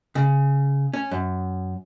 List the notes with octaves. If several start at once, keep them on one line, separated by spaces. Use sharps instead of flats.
C#3
C#4
F#2